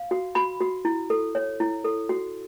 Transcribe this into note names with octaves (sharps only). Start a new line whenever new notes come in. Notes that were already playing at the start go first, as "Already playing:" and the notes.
Already playing: F5
F#4
F#4 B5
F#4
E4
A4
C#5
E4
A4
F#4